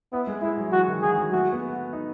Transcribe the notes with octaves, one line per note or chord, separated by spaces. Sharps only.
B3 E4
G#3
G#3 E4
F#3
E3 F#4
D#3
E3 G#4
F#3
A3 F#4
B3
D#4